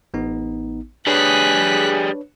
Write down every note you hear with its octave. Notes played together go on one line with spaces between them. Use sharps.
A1 B3 D#4
G3 D4 G#4 B4 C#5 F#6 B6